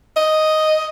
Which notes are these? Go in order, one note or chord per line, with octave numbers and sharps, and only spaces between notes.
D#5